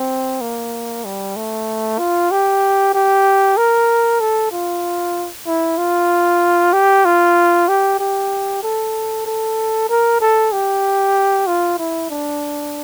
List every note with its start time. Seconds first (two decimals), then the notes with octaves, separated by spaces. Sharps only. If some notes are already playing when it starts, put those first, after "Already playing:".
Already playing: C4
0.41 A#3
1.05 G3
1.36 A3
1.99 F4
2.31 G4
2.94 G4
3.57 A#4
4.20 A4
4.51 F4
5.46 E4
5.78 F4
6.73 G4
7.05 F4
7.68 G4
7.99 G4
8.63 A4
9.26 A4
9.89 A#4
10.21 A4
10.52 G4
11.47 F4
11.78 E4
12.10 D4